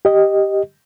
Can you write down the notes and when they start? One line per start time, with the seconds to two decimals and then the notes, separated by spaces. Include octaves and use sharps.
0.05 G4 D#5